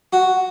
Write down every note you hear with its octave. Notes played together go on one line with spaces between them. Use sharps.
F#4